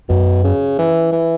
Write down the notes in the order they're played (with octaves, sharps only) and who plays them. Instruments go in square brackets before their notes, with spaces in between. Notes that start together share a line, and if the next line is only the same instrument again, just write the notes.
[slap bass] F#2 [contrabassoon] B2
[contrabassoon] C#3
E3
E3